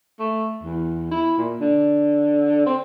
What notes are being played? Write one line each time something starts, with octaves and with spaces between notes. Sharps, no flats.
A3
E2
E4
A#2
D3
C4